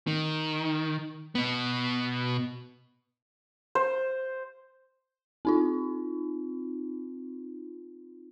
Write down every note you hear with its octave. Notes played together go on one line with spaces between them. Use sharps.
D#3
B2 B3
C5
C4 D#4 F4